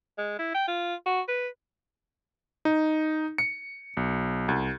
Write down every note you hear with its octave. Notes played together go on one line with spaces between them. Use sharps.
G#3
E4
G5
F4
F#4
B4
D#4
C#7
B1
C2